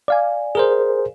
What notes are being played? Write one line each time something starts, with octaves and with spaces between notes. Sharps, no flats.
D5 F5 G#5
G#4 A#4 C5